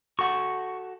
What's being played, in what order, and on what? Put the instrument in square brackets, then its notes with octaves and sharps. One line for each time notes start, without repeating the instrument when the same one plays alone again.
[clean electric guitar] F#4 A4 F#5 [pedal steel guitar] C#6